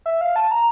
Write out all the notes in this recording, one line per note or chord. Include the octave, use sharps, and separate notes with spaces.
E5
F5
A5
A#5